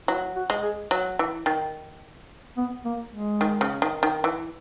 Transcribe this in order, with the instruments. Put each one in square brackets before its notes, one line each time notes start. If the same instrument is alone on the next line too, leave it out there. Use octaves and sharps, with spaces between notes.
[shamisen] F#3 [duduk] E4
[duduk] F#4
[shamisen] G#3
[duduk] G#4
[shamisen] F#3
E3
D#3
[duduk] B3
A#3
G#3
[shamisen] D#3
C#3
D#3
D#3
E3